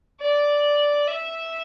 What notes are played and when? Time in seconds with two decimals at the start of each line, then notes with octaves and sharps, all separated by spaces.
0.21 D5
1.07 E5